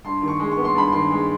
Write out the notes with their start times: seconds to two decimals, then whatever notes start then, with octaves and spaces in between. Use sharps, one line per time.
0.04 G2 C6
0.22 D#3
0.28 C#6
0.39 G#3
0.51 C#6
0.57 B3
0.64 C6
0.75 G2 B5
0.92 D#3 C6
1.11 G#3